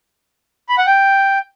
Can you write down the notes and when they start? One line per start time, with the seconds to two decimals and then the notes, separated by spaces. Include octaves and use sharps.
0.69 B5
0.78 F#5
0.87 G5